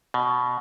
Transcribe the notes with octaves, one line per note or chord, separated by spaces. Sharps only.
B2